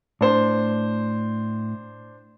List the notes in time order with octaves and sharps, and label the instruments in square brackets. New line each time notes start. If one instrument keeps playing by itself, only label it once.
[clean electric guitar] A2 [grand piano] D4 C5